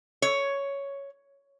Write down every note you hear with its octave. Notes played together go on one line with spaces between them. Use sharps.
C#5